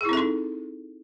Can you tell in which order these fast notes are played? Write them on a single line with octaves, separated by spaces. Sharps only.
G#4 E4 C4 A4 D#4